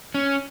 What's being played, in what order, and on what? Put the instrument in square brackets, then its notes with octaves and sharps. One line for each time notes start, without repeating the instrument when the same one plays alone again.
[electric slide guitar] C#4